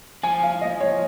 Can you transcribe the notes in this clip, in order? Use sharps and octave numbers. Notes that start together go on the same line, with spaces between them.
F3 G#5
F5
D#5
C#5